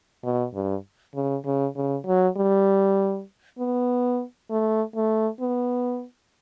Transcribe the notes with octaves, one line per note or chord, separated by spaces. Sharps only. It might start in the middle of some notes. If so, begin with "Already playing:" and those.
B2
G2
C#3
C#3
C#3
F#3
G3
B3
A3
A3
B3